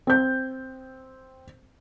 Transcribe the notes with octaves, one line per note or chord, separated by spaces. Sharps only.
C4 G6